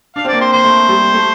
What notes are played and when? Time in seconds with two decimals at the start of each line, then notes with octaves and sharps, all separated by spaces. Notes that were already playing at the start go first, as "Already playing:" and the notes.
0.16 D4 F5
0.25 C4
0.28 A#3 D5
0.40 C4 C5
0.53 A#3 C5
0.64 A3
0.88 G3
1.13 A3